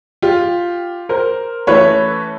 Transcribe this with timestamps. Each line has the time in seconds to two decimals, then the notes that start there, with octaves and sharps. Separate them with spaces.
0.22 F4 G4
1.09 A#4 C5
1.67 E3 A3 C#4 B4 C#5